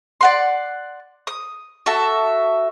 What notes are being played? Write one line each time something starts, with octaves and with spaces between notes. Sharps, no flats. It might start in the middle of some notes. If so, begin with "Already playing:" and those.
D5 F#5 C6
D#6
F#4 A4 E5 A5